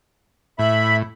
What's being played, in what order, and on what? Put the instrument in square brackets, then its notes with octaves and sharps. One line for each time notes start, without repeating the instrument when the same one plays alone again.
[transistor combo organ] A2 [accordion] E5 B5